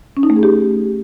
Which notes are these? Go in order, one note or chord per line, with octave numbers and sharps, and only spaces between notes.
C#4
D#4
A3
G#4
G4